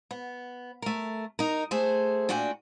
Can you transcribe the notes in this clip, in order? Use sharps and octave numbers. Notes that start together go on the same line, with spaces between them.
B3
A3 A#4
D#4 A#4
A3 G#4 C5
A#2 D4 F#4 G5 G#5